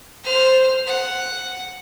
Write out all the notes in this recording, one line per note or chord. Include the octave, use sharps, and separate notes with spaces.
C5 F6
F#5